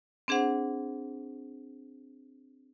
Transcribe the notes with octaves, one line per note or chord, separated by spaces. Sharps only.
C4 D4 G#4 C5 F#5